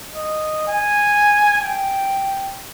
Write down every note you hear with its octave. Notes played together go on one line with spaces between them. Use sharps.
D#5
G#5
G5